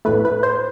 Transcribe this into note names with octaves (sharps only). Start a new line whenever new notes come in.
A2 E3 A3 B4
B4
C5